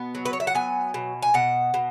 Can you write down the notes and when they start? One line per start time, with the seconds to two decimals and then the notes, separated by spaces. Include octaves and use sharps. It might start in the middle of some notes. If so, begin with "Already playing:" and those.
Already playing: B2 B3
0.15 F#3
0.25 B4
0.33 C#5
0.40 E5
0.47 F#5
0.55 B3 G#5
0.94 B2
1.22 G#5
1.34 B2 F#5
1.74 B2